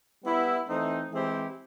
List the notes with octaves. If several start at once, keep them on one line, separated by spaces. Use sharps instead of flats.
G3 B3 E4
E3 A3 C4 D#4
E3 G#3 C4 E4 G4